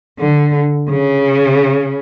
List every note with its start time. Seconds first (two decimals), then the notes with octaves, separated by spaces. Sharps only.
0.19 D3
0.90 C#3